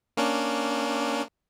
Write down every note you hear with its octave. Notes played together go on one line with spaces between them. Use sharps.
A#3 C#4 D4